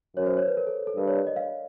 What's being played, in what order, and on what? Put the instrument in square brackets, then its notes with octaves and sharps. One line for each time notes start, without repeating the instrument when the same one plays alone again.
[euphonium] F#2 [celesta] C#5
[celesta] C5
C#5
B4
A#4
A4
A4
[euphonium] G2 [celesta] A#4
[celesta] C#5
D5
D#5
F5